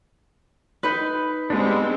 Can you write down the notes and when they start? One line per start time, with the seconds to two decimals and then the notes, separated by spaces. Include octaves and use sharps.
0.83 D#4 B4
1.50 G3 G#3 B3 C4 D4